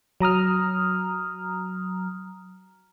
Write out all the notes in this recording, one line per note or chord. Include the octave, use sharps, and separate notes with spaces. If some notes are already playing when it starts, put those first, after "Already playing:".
F#3 A#5 D#6 F6